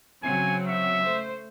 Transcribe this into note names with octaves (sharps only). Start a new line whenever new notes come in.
C#3 F#3 C4 G#5
E5
A3 C5